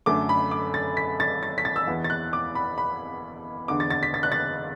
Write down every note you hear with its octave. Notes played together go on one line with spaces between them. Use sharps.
F#2 D3 A3 D6
B5
D6
A6
B6
A6
A6
B6
A6
E6
E2 E3 B3
A6
F#6
D6
B5
B5
E2 D3 B3 D6
A6
A6
B6
A6
F#6
A6